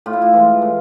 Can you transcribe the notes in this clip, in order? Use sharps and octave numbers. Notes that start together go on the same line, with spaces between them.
A2 F4
E4
F4
E3 G#3
A2